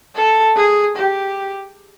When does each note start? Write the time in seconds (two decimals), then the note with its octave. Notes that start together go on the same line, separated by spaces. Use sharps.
0.15 A4
0.56 G#4
0.96 G4